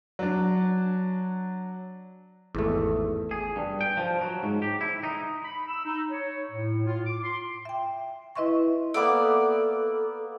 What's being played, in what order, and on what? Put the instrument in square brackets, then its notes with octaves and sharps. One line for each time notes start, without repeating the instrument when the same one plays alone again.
[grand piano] F#3 D4
[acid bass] G#1 [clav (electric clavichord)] E2 A3
[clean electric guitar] G#4
G2
G5
F3
F#3
G#2
G4
E4
D#4
[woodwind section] B5
E6
D#4
C#5
A2
F4
D6
C6
[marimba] E5 G5
E4 B4 D#5 E5 C6 C#6
[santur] A#3 B3 E5 [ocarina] A4 [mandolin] D5 D6